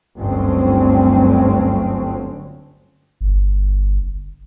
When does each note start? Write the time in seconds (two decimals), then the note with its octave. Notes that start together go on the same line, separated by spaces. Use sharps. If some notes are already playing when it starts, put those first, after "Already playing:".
0.17 G1 D2 D3 F#3 C4 C#4
3.21 G1